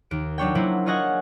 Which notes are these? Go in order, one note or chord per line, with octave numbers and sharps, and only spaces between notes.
D#2 D7
F#3 D4 C#5 G5
F#3 A#3 E4 C5
F4 G#4 C#5 D#5 F#5 G#5